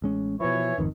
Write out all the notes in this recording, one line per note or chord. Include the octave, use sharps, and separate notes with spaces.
A1 G#3 C#4
B2 E3 F3 C#5
G#1 F2 D#3